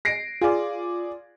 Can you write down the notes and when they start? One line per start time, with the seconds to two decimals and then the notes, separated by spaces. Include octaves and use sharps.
0.05 A#6 C7 D7
0.41 F4 G#4 D5